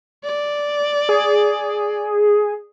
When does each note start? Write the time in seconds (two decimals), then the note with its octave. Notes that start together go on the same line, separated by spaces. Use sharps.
0.24 D5
1.09 G#4